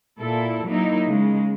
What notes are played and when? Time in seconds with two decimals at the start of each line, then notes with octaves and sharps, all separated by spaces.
0.20 A#2 E4 A4
0.67 F#3 A#3 D#4 E4
1.07 C#3 G#3